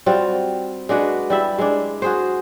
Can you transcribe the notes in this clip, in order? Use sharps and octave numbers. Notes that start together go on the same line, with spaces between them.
G3 C4 F4 F#4
G#3 D4 F#4 B4
G3 E4 E5
G#3 D4
F#4 G#4 C5